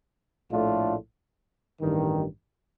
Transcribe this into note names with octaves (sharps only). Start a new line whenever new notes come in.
A#1 A2 A3 D4 F4
A1 G2 D#3